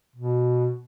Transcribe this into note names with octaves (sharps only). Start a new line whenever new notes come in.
B2